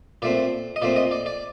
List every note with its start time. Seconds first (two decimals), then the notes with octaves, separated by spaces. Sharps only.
0.22 A#2 A3 C4 D5
0.76 D#5
0.82 A#2 A3 C4 D5
0.96 D#5
1.11 D5
1.26 D5